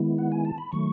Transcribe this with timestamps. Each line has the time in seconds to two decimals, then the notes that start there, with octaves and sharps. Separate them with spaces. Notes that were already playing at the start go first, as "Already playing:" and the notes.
Already playing: D#3 G#3 B3 E4
0.18 F#5
0.32 G#5
0.45 A5
0.58 B5
0.72 D#3 F#3 A3 C#6